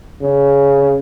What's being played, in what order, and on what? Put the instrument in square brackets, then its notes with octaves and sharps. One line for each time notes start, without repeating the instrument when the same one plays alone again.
[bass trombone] C#3